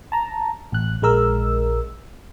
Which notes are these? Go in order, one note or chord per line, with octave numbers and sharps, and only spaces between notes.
A5 A#5
A1 F#6
A#1 G#3 A#4 E6